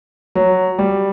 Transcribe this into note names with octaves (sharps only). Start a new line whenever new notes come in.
F#3
G3